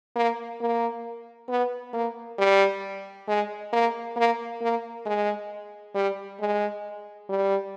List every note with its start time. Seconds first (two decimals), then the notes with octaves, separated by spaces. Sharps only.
0.16 A#3
0.60 A#3
1.49 B3
1.93 A#3
2.38 G3
3.28 G#3
3.73 A#3
4.16 A#3
4.61 A#3
5.05 G#3
5.95 G3
6.40 G#3
7.29 G3